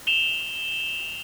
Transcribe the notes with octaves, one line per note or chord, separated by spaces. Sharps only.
E7 F7 G7